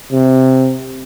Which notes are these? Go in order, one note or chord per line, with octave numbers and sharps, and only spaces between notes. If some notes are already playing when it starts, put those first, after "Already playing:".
C3